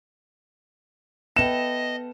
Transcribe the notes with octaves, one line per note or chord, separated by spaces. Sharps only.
B3 A4 D#5 E5 G5 E7